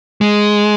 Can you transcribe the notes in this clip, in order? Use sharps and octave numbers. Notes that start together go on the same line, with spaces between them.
G#3